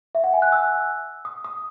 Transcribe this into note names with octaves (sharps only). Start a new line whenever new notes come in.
E5
F#5
G#5
F#6
E6
D#6
D#6